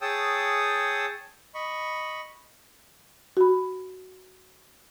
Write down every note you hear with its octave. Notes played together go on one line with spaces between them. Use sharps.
G#4 C#5 G5 A5 D#6 E6
D#5 B5 C#6
F#4 B5